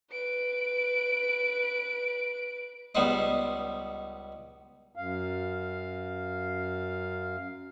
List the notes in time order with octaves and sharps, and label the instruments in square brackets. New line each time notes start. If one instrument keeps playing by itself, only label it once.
[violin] B4 D7
[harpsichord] C#2 G3 B3 D#4 C5 D#5
[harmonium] F#2 F5